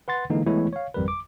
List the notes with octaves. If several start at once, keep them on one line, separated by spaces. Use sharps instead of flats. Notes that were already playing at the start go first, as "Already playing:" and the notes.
B4 F#5 C6 A6
D3 E3 G#3 A#3 D#4
E3 G#3 A3 B3 E4 C#5
C#5 F5
G#1 F2 G3 A#4 B4
D6